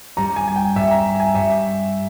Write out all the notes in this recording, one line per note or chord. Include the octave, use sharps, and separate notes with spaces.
G2 G3 C#4 A#5
G#5
G#5
G5
G2 G3 C#4 E5
A#5
G#5
G2 G3 C#4 E5